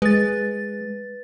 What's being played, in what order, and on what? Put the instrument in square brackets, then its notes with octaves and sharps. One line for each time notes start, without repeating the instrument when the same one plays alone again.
[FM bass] G#3 [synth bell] B4 A6